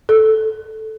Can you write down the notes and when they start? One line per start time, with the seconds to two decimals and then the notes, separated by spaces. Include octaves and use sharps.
0.09 A4